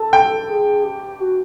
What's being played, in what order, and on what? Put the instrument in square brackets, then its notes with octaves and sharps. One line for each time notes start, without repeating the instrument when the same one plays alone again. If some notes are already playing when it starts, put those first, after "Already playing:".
Already playing: [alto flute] A4 [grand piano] A5
[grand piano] G5
[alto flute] A4
G#4
G4
F#4